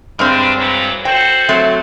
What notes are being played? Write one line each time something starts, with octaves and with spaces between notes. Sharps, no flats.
G2 C3 G3 G#3 C4 D4
A#2 E3 F#3
F#4 A4 C5 G5
F#3 A3 C4